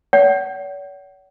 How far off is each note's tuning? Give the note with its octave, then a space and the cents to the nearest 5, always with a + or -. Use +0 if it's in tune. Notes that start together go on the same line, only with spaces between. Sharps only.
C#5 +45 F#5 +35